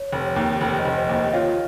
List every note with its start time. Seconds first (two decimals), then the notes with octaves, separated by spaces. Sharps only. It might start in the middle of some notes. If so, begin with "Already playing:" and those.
Already playing: C#5
0.12 F1
0.25 C#5
0.36 D#2
0.61 F1
0.78 C5 D#5
0.85 F1
0.96 C5 D#5
1.09 D#2
1.15 C5 D#5
1.33 F4 C#5 F5